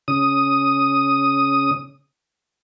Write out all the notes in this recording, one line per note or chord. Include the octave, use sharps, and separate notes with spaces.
C#3 D#6